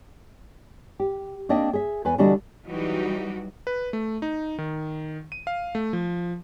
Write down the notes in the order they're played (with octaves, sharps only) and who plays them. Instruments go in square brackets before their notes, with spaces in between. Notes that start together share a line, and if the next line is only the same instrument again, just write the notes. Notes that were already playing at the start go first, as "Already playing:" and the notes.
[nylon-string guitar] G4
A#3 C4 D4 D#5 E5 G5
G#4 E5
E2 B4 G#5
D3 E3 G3 D4 F#4 D#5
[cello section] E3 F#3 G3 D#4 F#4 G4
[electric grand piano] B4
A3
D#4
D#3
D#7
F5
A3
F3